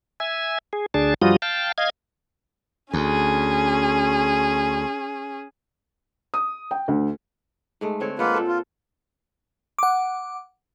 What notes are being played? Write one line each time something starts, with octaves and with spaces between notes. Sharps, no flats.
E5 G#5
G#4
D2 D4 G#4 A5
G2 F3 G3 F4 F#4 D#6
F5 G5 A5
D#5 F5 G#6
D2 C#4 G#4
D#6
G5
D2
G#2 G#3 A3
D3 C4 C#5
G#3 A#3 F4 B4 F#5
A#2 A4
F4
F#5 D6